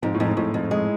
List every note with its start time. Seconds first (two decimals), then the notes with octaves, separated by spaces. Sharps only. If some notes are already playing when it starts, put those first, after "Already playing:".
0.03 F2 G#2
0.14 A2
0.20 F2
0.25 G#2
0.37 F2 A2
0.54 F2
0.71 G#3